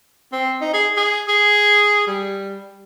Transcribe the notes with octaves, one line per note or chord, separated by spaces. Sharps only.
C4
D#4
G#4
G#4
G#4
G3